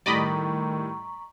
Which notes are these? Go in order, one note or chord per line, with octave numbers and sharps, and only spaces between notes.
A2 D#3 G3 D5 D#5 A#5 B5 C#6